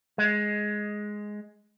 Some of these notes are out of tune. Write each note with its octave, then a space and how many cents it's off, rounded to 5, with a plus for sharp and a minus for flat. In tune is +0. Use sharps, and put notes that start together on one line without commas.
G#3 +5